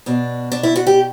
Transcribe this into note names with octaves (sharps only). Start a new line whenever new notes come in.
B2 D4
D4
E4
F#4
G4